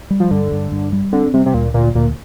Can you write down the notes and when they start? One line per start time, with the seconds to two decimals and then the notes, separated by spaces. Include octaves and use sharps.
0.10 G3
0.20 F3
0.31 G2 D3
0.52 G2
0.72 G2
0.93 G3
1.13 D3 C4
1.34 C3 G3
1.46 C3
1.54 D2 A#2
1.74 D2 A#2
1.95 D2 A#2